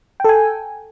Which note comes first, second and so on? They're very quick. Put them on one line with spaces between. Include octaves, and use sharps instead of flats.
G5 A4 G#5